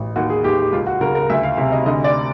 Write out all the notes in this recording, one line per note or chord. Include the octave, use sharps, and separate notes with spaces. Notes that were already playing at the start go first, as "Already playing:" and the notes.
Already playing: A1
D#2 F#4
G#4
D#2 G4
G4
C#2 F4
F#4
C#3 A#4
A#4
D2 E5
F5
C3 E5
D#5
D3 D#5
D5